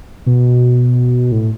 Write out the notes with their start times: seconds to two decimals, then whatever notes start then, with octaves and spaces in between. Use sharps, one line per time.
0.26 B2
1.32 A2